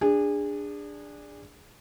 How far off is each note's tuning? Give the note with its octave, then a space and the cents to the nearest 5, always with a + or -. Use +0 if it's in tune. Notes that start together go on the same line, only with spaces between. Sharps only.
D4 +0 G#4 -25